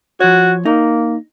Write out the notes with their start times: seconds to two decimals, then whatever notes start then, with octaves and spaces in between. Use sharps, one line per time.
0.20 F3 F#4 C#5
0.66 A#3 D#4